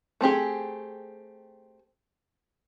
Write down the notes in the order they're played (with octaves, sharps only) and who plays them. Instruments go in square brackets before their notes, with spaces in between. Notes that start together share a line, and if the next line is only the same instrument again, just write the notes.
[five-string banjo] A3 C4 G4 G#4